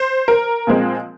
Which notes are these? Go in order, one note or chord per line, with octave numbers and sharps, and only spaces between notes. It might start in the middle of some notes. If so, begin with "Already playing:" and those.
Already playing: C5
A#4
A#2 F3 G#3 C4